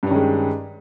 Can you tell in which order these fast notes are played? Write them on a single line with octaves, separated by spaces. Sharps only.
G2 C#4 D#3 G#3